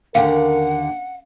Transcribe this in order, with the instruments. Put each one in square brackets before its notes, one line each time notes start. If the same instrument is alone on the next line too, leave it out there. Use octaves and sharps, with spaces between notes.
[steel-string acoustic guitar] D#2 D3 [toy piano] C#4 F5 [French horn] A#4 [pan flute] F#5